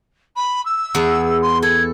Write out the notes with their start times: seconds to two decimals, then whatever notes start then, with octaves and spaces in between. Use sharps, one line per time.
0.36 B5
0.65 E6
0.95 E2 G#4
1.41 C6
1.62 A4 G#6